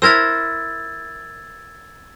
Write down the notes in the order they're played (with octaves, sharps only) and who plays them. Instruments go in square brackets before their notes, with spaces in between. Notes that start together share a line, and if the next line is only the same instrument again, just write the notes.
[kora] E4 A#4 C5 [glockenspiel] E6 G#6 A6